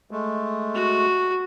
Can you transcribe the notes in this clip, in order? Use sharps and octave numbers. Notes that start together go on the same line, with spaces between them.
G#3 A3
F#4